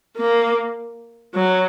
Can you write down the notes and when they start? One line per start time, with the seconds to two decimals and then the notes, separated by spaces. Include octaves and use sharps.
0.17 A#3
1.35 F#3